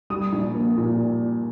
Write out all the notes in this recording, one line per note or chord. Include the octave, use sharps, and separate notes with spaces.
G3 D#6
A#1
A#3
A#2